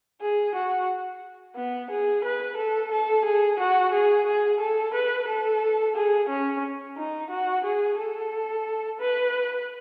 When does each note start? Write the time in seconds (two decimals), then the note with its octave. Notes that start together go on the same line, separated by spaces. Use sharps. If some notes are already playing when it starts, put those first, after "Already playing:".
0.21 G#4
0.55 F#4
1.56 B3
1.91 G#4
2.24 B4
2.57 A4
2.91 A4
3.25 G#4
3.59 F#4
3.93 G#4
4.27 G#4
4.60 A4
4.94 B4
5.28 A4
5.96 G#4
6.29 C#4
6.97 D#4
7.30 F#4
7.65 G#4
7.98 A4
9.00 B4